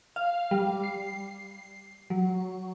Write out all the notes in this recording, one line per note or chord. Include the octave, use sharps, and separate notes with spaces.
F5
G3
C7
F#3